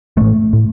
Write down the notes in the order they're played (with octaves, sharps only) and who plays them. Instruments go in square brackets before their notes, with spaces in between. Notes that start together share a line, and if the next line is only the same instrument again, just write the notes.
[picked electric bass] A1 A2 A3
A2